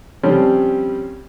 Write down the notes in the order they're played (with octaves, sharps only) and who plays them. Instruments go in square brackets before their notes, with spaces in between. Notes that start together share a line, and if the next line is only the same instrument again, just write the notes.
[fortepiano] F3 G3 C4 C#4